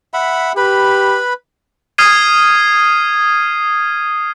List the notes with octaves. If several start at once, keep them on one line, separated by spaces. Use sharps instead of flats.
E5 F#5 B5
G4 B4 B5
D#6 F6 G#6 C7 D#7